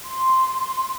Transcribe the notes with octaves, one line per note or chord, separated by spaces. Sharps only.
C6